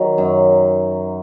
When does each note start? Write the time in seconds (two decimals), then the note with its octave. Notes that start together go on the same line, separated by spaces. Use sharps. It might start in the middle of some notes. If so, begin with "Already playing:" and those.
Already playing: D#3 F#3
0.18 F#2